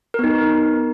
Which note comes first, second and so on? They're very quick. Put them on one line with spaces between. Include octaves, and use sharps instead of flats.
A#4 B3 D#4